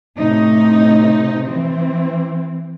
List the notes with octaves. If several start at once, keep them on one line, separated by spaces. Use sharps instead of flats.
A2 C3 D#4
E3 C4